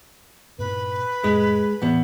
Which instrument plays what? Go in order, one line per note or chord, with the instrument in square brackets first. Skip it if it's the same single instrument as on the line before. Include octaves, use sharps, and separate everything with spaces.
[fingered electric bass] G2 A#2 A#3 [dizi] B4
[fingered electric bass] F2 A2 [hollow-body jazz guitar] G#3
[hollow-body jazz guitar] E2 B3 [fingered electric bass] A2 C4